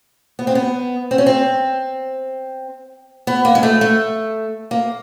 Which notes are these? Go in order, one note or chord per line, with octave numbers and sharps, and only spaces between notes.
B3
C4
B3
C4
C#4
C4
B3
A#3
G#3
A3
A3
A#3